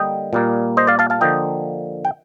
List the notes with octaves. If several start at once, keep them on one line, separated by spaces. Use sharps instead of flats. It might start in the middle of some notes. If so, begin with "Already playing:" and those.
Already playing: D3 G3 A#3 D#5 G5
A#2 G3 A#3
C5 D#5
D5 F5
F5 A5
F5 A5
D3 F3 A#3 D#5 G5
G5